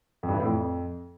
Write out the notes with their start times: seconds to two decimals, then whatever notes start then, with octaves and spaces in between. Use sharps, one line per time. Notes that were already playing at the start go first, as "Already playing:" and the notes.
0.23 F2
0.29 G2
0.34 E3
0.40 A2
0.45 F2